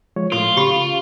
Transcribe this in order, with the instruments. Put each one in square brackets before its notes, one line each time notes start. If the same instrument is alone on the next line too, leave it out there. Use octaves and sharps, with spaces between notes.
[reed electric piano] F3 G#3 C#5
[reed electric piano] A2 C6 [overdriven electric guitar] F4 [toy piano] A4
[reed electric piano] C#3 [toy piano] G4 B5 C#6